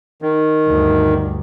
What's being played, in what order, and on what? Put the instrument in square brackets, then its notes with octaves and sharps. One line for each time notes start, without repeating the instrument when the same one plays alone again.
[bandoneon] D#3
[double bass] D2 G2